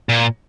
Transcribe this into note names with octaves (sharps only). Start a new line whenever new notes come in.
A#2